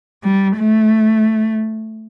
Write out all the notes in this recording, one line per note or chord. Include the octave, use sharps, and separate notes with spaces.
G3
A3